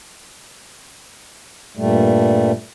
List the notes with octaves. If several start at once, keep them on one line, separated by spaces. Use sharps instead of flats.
G2 A#2 G3 A3